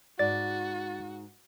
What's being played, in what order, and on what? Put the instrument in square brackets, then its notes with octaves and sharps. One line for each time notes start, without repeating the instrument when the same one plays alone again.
[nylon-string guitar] G#2 [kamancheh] F#4 [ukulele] D5 [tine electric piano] A6